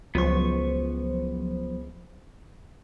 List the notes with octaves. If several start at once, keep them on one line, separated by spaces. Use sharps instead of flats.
C#2 F3 F#3 B3 C5 C#6